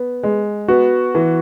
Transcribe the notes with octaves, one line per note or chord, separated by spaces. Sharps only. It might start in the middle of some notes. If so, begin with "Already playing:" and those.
Already playing: B3
G#3
B3 F#4
E3